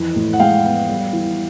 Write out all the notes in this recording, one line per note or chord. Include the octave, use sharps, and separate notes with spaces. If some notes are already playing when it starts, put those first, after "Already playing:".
Already playing: F2 E3
A2
F#5
G#3 F5 G5
B3
G3
E3